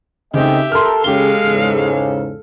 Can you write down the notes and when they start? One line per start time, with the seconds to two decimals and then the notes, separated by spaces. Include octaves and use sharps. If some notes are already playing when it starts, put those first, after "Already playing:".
0.34 C#3 A3 C4 D#4 G4 D#5 E5 G5
0.72 A4 A#4 C6 F6
1.04 C#3 G#3 G4 A4 F5 G7
1.43 E2 G#2 C#3